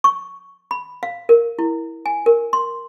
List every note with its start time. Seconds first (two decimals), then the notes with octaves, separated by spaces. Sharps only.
0.04 C#6
0.71 B5
1.03 F5
1.29 A#4
1.59 E4
2.06 G#5
2.26 A#4
2.53 C6